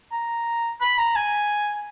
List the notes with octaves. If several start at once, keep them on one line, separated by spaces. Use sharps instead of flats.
A#5
B5
A#5
G#5